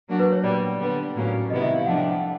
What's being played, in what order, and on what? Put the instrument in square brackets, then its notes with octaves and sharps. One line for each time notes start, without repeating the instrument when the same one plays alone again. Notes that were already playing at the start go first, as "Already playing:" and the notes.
[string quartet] F#3 A#3 D4 F#4
[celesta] B4
C#5
[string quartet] A#2 G3 B3 [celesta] D5
[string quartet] D3 G3 B3
A2 F#3 A#3 C#4
[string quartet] C3 D#3 G3 B3 E4 [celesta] D#5
[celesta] E5
F5
[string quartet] F3 A3 D4 [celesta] F#5
[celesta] G5
F#5